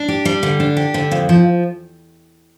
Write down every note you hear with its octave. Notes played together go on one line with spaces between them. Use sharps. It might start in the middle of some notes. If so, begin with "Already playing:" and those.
Already playing: D4
G4
G3
D3
D4
G4
D3
F2
F3